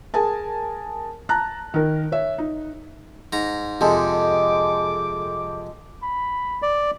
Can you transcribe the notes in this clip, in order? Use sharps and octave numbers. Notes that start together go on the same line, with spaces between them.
G#4 A#4 G#5 A5
A5 A#5 F#6
D#3 A#4
C#5 E5
D#4
G#2 A#5
F2 C3 G#3 A4 D6
B5
D5